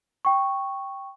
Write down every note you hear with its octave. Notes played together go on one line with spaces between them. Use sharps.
G5 C#6